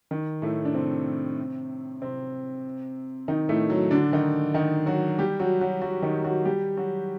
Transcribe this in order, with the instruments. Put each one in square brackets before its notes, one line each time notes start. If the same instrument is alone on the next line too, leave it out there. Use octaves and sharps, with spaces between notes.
[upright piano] D#3
A2 A3
D4
C3 C4
C3 C4
D#3 D#4
A2 A3
F#3
D3 D4
D#3 D#4
D#3 D#4
F#3 F#4
G3 G4
F#3 F#4
F#3 F#4
F#3 F#4
D#3 D#4
F#3 F#4
G3 G4
F#3 F#4